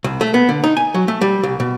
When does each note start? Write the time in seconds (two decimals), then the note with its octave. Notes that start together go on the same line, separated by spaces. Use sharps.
0.04 C2
0.21 A3
0.34 B3
0.49 D3
0.64 D#4
0.77 G#5
0.94 F#3
1.08 A3
1.21 G3
1.43 C2
1.60 B2